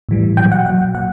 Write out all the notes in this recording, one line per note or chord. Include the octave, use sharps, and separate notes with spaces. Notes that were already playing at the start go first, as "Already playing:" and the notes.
A2 E3 G3
A#2 F#3 G5
F#5
A#2 F#3 F#5
A#2 F#5